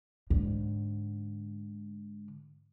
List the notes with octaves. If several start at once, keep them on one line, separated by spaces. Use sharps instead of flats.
G#2 D3